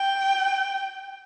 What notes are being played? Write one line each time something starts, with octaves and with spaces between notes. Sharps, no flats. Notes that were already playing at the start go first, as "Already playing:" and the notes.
Already playing: G5